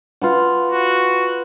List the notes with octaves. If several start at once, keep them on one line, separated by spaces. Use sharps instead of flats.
F4 B4 F#5
F#4